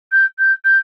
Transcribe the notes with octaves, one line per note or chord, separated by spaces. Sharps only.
G6
G6
G6